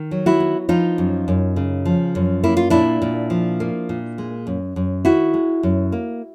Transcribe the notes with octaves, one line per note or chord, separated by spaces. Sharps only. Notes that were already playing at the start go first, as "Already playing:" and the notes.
Already playing: D#3
F#3
E4 F#4
B3
F3 D#4 F4
F#2
F#2
C#3
F3
F#2
A#3 E4
F4
A#2 D4 E4
A#2
F3
A#3
A#2
G#3
F#2
F#2
D#3 E4 F#4
G#3
F#2
A#3